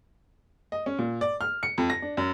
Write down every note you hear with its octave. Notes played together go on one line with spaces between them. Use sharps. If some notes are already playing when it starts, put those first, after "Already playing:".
D#5
C#4
A#2
D5
F6
C#7
F2
A#6
D4
F#2